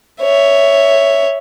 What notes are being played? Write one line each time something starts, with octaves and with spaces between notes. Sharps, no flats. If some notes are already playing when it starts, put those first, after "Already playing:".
C#5 E5